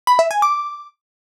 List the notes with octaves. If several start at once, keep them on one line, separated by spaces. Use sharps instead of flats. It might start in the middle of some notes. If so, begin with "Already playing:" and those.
B5
E5
G#5
D6